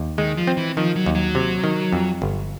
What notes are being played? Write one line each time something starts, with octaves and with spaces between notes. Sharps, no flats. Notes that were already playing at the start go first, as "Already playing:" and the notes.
Already playing: D#2
D#3 G#3
F3
C4
E3
D#3 F3
F#3
D#2
F#3
C3
D#3
F2
G1